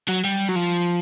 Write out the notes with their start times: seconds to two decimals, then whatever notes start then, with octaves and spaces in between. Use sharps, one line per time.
0.09 F#3
0.25 G3
0.49 F#3
0.56 F3